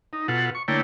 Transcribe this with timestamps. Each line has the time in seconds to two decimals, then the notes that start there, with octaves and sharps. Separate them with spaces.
0.13 D#4
0.28 B2 F4 A4 F#5
0.55 C#6
0.68 D3 A3 A#3 E4 C#5 G5